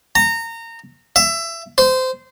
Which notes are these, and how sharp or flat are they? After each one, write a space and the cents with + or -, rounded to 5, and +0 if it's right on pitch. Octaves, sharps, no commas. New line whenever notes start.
A#5 -25
E5 +20
C5 -20